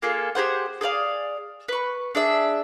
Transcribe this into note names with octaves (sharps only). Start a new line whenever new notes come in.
A#3 F4 G#4 A4
G4 G#4 C5 F#5
G#4 A4 D5 F5
B4 C#6
D4 G#4 E5